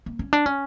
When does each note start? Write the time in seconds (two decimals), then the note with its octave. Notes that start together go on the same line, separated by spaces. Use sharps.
0.06 A#3
0.19 C#4
0.33 D4
0.46 C#4